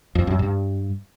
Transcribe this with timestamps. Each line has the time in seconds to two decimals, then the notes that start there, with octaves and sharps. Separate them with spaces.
0.15 F2
0.27 F#2
0.39 G2